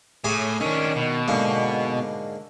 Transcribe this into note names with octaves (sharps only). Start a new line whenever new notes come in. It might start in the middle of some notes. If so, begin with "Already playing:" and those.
A2 G#4 C#5 D6
D#3 C#4 D4
B2
G#2 D3 A#3